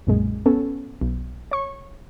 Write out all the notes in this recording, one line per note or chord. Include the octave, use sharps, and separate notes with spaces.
B1 F#2 A#2 G#3
B3 C#4 A4
B1
C#5 C#6